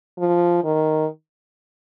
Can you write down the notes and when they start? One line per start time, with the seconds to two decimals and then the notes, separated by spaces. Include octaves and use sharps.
0.18 F3
0.64 D#3